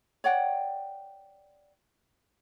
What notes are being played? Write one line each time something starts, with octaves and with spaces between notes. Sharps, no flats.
C#5 D5 F#5 G5